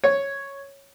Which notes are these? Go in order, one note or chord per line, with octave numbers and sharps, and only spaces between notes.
C#5